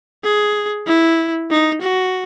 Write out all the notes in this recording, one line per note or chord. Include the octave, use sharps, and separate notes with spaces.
G#4
E4
D#4
F#4